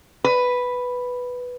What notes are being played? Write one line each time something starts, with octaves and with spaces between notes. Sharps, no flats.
B4